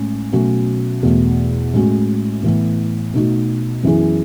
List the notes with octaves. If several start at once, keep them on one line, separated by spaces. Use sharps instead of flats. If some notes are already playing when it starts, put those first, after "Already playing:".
Already playing: A2 G#3 C#4
B2 F#3 A3 C#4 F#4
E2 B2 A3
A2 G#3 C#4 F#4
A2 E3 B3
B2 A3 D#4 F#4
F#2 E3 B3 E4 G#4